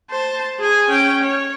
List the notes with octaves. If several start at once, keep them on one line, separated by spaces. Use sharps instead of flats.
C5 A5
G#4 G#5
C#4 G5
C#5